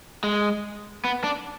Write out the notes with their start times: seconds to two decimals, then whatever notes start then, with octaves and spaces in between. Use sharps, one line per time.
0.24 G#3
1.04 B3
1.24 D4